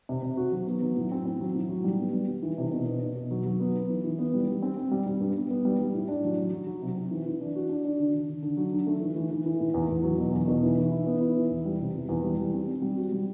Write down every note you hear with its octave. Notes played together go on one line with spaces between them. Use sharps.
C3
C3
F#4
F#3
B3
F#3
A2
C4
C4
F#3
A2
F#3
G3
B3
G3
G3
E3
C3
B2
B2
B2
B2
F#3
F#3
B3
B3
E3
E3
B3
G3
G3
C4
C4
G3
G3
G2
B3
B3
G3
G3
A2
D4
F#3
F#3
F#3
F#3
C3
C4
E3
E3
D4
F#4
D4
D4
D3
D3
D3
D3
F#3
D3
A3
E3
E3
E3
E3
A2
E2
E2
F#3
B2
E2
B2
E3
E3
E4
B3
E4
E3
E2
G3
C3
E2
E2
G3
G3
C4
C4
G3
F#4
G3